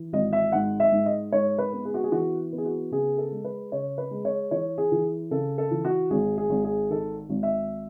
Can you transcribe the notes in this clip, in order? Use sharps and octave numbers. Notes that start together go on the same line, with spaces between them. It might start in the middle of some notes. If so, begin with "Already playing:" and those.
Already playing: E3
G#1 D#5
E5
G#2 F#5
E5
G#2
D#5
G#2 C#5
B4
B3
G#4
F#4
G#4
E3 F#4
B3
G#4
F#4
C#3 G#4
A4
G#3
B4
C#3 C#5
B4
G#3
C#5
E3 C#5
G#4
E3
C#3 A4
A4
E3
F#4
G#1 G#4
G#4
G#1
G#4
D#3 A4
G#1
E5